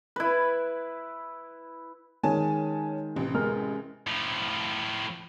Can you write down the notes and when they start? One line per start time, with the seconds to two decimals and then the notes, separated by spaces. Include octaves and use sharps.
0.16 E4 B4
2.23 D#3 G#3 C#4 G#5 A5
3.16 A1 C3
3.34 G#3 A#4 F6
4.07 A2 F3